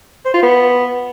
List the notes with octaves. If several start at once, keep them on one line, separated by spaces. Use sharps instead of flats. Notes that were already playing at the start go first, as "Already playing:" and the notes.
C5
F4
B3